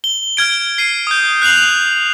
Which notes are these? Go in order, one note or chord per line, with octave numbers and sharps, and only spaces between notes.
G7
F6 G#6 D7
C7 D#7
D#6 G6
F#6 C7 F7 F#7